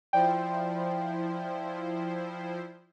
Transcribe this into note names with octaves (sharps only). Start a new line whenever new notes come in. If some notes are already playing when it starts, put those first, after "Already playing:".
F3 E4 C5 D5 G5